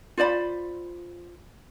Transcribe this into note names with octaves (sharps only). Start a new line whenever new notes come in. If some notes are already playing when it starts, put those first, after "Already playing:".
F4 C5 D5 B5